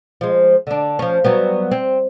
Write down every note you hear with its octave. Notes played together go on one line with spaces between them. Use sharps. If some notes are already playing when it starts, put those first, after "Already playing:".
F3 G#3
D3 D4
F3 C#4
F#3 G3 B3
C4